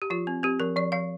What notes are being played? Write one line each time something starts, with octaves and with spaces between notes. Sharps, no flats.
G4
F3 F4
C4
C4 G4
F3 A#4
F3 D5
F3 F5